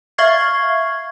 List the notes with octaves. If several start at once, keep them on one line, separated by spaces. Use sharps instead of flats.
E5 F5 C#6 F6 G#6 C7